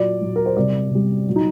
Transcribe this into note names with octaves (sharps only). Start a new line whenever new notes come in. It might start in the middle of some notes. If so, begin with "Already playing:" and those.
Already playing: A#2 F#3 D5
A#2 F#3
A#4
C5
C3 G3 D5
C3 G3
A#2 F#3
D#4